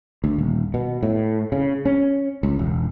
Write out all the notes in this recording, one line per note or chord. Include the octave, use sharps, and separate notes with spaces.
D2
D#1
B2
A2
C#3
C#4
C#2
E1